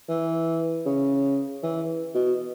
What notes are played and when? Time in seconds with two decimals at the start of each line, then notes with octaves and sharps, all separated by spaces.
0.09 E3
0.86 C#3
1.63 E3
2.15 B2